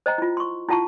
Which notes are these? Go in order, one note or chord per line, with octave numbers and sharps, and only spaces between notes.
C5 D#5 G5 A#5
E4 F4
C6 C#6
E4 F4 F#5 A5 A#5 C#6